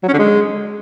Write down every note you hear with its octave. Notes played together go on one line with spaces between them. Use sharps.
F#3
C#4
D3
G#3